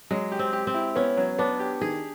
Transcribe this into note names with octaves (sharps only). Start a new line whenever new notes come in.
F#3 G#3
G4
C4
G4
C4
E4
B3 C#4
F#3
B3 D4
G4
D#3 G#4